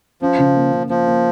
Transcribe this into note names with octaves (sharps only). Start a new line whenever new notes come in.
F3 C#4
C#3
A#3
C#3
F3 A#3
A#3